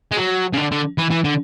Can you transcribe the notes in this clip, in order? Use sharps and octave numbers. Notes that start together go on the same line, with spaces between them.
G#3
F#3
C#3
D3
D3
E3
E3
D3